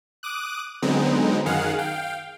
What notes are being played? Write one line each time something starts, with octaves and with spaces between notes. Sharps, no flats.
D6 D#6 F#6
D3 F#3 G#3 B3 C4 D#4
F#2 D#3 G#4 F5 F#5
F5 G5